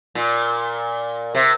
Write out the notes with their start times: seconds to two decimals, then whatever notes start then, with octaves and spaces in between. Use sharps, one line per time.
0.15 A#2
1.35 C3